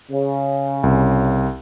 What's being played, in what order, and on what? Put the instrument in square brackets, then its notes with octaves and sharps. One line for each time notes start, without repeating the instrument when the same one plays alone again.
[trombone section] C#3
[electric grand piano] C2